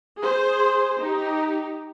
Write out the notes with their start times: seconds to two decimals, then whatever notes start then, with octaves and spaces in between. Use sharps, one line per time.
0.19 G#4 C5
1.00 D#4 G4